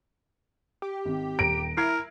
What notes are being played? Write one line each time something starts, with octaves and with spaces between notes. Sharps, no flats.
G4
G#1
D#1 A#5 A#6 D7
E4 A#4 F6 G#6 C7